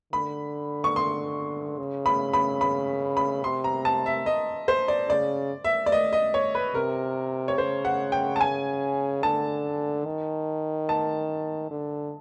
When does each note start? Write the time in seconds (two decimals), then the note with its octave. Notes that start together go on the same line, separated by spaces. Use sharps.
0.13 D3 B5
0.84 C#6
0.96 C6
1.78 C#3
2.06 B5
2.33 B5
2.61 B5
3.17 B5
3.44 C3 C6
3.64 A#5
3.85 A5
4.06 E5
4.26 D#5
4.68 C5
4.88 D5
5.09 C#3 D5
5.64 E5
5.86 D5
5.92 D#5
6.13 D#5
6.34 C#5
6.55 B4
6.75 C3 A#4
7.48 C#5
7.58 C#3 C5
7.85 F#5
8.12 G5
8.36 A5
8.41 G#5
9.23 D3 A5
10.06 D#3
10.89 A5
11.71 D3